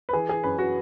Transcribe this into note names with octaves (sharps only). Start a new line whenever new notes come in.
B4
E3 G#4
G#4
F#2 B4
F#4